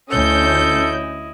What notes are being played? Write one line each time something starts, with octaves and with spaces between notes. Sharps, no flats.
D2 C#4 E4 A4 D#5 G6